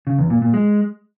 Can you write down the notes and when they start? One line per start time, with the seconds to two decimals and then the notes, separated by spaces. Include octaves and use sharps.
0.07 C#3
0.18 E2
0.30 A#2
0.42 A#2
0.54 G#3